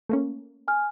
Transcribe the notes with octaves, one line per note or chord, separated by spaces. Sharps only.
A3 A#3 C#4
G#5 F6